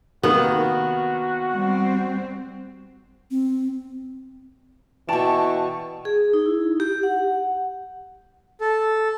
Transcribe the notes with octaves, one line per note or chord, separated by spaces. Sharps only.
C3 D#3 A#3 B3 F#4
G3 C4
C4
B2 E3 D5 G5 A5 C#6 E7
G#4
D#4
E4
G4
F#5
A4